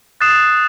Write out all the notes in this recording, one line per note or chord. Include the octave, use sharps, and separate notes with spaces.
D#6 F#6 A6 C7 E7